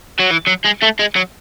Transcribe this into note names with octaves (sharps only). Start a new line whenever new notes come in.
F#3
E3
F#3
G#3
A3
G#3
F#3